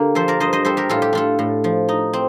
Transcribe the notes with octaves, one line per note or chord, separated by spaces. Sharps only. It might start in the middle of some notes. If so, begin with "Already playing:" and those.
Already playing: D3 A#3 G4
F3 A4 C5
A#4 D5
G2 C5 D#5
C5 D#5
G3 A4 C5
G4 A#4
A2 F4 A4
G4
D4 F4 A4
A2
F3
D#4
C4